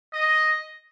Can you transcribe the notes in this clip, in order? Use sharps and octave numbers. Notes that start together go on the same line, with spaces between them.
D#5